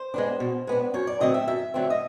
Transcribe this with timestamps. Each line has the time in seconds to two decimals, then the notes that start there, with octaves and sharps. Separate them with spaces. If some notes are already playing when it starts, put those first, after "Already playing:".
Already playing: C5
0.14 G#3 B3 D4
0.40 B2
0.67 G#3 B3 D4
0.94 F#2 C#5
1.07 D5
1.20 D3 F#3 A3 C4 D#5
1.34 E5
1.47 F#2 E5
1.74 D3 F#3 A3 C4
1.90 D#5